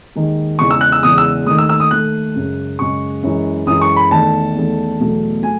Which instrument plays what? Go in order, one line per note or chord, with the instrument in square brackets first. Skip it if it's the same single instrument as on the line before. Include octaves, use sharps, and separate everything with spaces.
[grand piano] D#2 D#3 G#3
E2 C#3 E3 G#3 C#6
E6
F#6
E6
E2 C#3 E3 G#3 D#6
E6
D#2 D#3 A3 D#6
E6
E6
D#6
D#2 D#3 A3 F#6
F#2 C#3 G#3
F#2 C#3 G#3 C#6
F#2 E3 G#3
F#2 E3 G#3 D#6
C#6
B5
E2 D#3 A3 A5
E2 D#3 A3
E2 B2 F#3 A3
F#3 A3 G#5